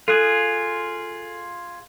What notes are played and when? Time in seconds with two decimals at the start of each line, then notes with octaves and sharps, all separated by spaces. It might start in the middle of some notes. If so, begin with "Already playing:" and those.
0.08 F4 G#4 A4 F#6 D#7